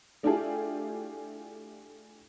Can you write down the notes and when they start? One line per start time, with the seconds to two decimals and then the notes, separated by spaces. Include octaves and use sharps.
0.23 A3 D4 E4 F4 G4 G#4